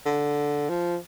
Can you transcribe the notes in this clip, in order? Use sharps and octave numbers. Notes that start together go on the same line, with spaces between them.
D3
F3